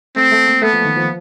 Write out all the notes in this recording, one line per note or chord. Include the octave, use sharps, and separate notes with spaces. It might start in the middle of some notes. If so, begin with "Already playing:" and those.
A3 C4
A3
A#3
A3 B3
F3
D#3
F3